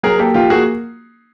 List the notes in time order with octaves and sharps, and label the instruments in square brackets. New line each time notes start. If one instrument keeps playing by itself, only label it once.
[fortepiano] F#3 [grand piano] G#4 A#4
[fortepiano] A#3 [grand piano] G4 A4
[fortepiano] F3 [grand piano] F4 G4
[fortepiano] A#3 [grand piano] F#4 G#4